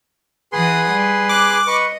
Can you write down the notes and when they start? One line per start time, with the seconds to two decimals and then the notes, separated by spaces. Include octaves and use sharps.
0.52 E3 G#4 B4 F#5 C6 D#6
0.91 G3
1.29 D6 F#6
1.67 B4 D#5 C#6